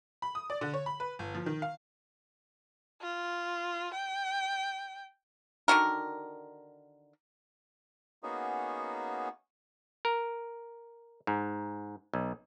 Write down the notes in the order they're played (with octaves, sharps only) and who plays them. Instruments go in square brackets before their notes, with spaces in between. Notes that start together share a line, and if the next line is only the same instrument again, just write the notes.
[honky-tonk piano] B5
D#6
D5
D3
C#5
B5
B4
G1
F3
D#3
F5
[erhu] F4
G5
[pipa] D3 D#3 F#4 A#4
[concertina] A#3 B3 C#4 D#4 F#4 G#4
[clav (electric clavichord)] A#4
G#2
B1